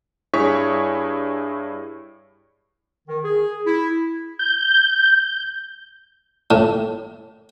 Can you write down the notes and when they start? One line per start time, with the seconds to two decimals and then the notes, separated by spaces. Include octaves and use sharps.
0.34 G2 E4 G#4 C#5 C#6 B6
3.08 D#3
3.23 G#4
3.66 E4
4.39 G6
6.51 A2